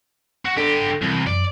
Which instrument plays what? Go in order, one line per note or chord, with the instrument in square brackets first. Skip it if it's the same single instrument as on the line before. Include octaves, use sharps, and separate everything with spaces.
[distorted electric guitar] F#4
[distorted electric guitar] D3 G4 [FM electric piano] D4 A4 A#6
[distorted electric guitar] C2 [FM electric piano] C3 E3
[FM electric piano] F#2 [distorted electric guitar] D5